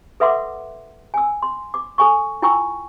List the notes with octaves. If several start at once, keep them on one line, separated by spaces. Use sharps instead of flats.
A4 B4 E5 F#5 C6 D6
G#5 E6
C6
D6
A4 G#5 C#6
E4 F4 G5 G#5 C#6 E6